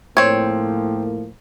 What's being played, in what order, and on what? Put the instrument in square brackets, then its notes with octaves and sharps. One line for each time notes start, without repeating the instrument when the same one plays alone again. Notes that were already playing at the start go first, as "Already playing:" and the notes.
[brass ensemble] A2 F3 A#3 [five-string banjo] C4 C#5